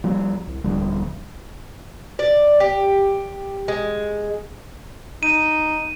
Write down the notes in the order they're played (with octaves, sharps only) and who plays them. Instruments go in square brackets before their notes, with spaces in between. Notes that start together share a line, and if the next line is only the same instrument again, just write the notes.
[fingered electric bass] F3 G3
C2
D#1 D3 F3 G3
[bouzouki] D5
G4
G#3
[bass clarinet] D#4 [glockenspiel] D#7